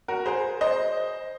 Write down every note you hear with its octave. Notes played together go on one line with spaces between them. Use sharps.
F#4 A#4
G#4 C5
C5 D#5